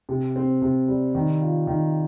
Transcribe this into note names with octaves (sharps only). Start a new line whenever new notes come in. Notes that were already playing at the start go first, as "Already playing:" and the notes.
C3
C4
C3
G3
D#3
F4
D#3